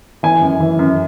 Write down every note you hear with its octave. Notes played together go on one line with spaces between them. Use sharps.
E3 G#5
F#2
E3
F#2